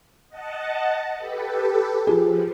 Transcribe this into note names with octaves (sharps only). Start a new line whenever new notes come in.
D#5 F#5 A5
G4 A4 B4
F3 F4 G4 G#4